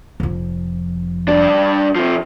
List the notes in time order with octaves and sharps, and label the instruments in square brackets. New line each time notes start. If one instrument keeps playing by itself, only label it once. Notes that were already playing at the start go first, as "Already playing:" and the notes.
[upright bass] F1 F2
[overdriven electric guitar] G2 D4
C3 F3